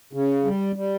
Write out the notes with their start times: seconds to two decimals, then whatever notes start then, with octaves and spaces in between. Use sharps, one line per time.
0.13 C#3
0.45 G3
0.76 G3